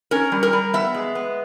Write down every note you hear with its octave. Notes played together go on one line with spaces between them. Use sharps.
C#4 A#4
G3
A#4
G3
B3 E5
G#3
B3